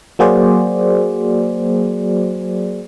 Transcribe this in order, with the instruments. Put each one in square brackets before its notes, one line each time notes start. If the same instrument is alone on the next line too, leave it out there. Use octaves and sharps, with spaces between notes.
[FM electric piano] F#3 A#3 F#4 G#4 C5 D5